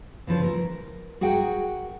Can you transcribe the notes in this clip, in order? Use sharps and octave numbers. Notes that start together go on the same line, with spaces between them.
C#3 E3 F3
A#4
F#4 G#4 A#4 F#5 G5